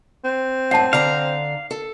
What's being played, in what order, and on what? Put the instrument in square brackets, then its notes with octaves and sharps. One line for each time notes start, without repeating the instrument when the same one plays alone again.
[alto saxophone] C4
[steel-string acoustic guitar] F#2 A2 [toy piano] F#5 A5
[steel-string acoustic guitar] D3 A#5 [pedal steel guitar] F5
[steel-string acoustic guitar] A4